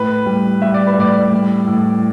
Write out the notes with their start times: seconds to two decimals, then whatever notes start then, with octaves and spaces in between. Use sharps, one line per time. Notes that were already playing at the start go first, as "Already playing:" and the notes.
Already playing: A2 B4
0.26 G3
0.62 G3 E5
0.74 D5
0.87 B4
0.97 A2 D5
1.32 G3
1.67 A2